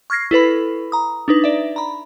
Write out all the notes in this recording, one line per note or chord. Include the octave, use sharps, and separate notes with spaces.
C#6 F6 G#6 A#6 C7
E4 A4 B4 B5
A#5 D#6
D4 D#4 B4
D5 E5
A#5 B5